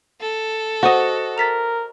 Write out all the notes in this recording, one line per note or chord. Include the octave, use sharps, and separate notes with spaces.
A4
F#4 C5 D#5 F#5
A#4 A6 B6 F7